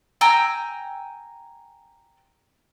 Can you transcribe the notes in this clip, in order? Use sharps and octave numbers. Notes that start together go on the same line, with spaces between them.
G5 G#5 A#5 E6